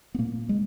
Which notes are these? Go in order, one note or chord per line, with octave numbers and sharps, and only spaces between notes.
B3
A#2 A#3
G#3